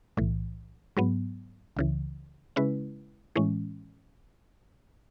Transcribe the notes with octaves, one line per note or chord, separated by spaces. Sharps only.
B1 A2 E3
G#2 F#3 B3
C#2 C#3 E3
C#3 G#3 C#4 E4 B4
A2 E3 G#3 C#4